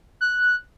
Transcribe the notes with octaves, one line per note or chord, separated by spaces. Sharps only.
F#6